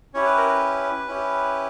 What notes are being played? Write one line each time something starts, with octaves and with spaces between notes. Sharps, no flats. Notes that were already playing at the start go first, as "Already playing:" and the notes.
C#4 E4 G4 C#5
B4
A#4
B4
C#4 E4 G4